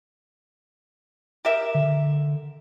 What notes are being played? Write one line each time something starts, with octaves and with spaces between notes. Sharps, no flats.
G4 A#4 E5
D3